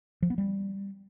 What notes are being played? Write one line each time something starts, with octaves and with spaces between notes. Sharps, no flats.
F3
B3
G3